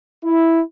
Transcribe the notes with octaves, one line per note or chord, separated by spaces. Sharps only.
E4